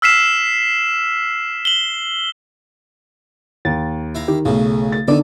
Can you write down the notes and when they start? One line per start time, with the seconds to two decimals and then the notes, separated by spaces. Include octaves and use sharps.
0.02 E6 F6 B6 C7 E7
1.65 F#7 G7
3.65 D#2 A6
4.15 E4 F5 A#5
4.28 D#3 G4
4.45 B1 A2 C#3
4.92 A6
5.08 D3 D#3 B3 D4 D#4 A4 D5